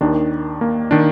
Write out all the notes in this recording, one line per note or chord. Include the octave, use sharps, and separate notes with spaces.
D#2 D#3 D4
A#3
D#3 D4